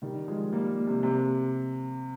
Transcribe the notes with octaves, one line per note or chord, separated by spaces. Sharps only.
D#3 G3
F3 G#3
G3 A#3
C3
C3